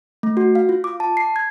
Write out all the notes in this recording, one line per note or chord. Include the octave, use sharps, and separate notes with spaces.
A3
F#4
F5
F4
D6
A5
C7
G#6